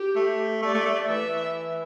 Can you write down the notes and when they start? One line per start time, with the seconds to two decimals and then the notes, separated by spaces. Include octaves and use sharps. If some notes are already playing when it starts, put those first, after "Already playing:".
Already playing: G4
0.15 A3
0.62 A3 D5
0.75 A3
0.86 A3
1.09 E3 E5